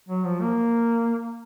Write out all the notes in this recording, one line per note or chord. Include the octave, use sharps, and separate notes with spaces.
F#3
F3
A#3